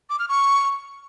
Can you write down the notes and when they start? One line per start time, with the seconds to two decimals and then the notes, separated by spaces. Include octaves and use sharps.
0.10 D6
0.19 F6
0.29 C#6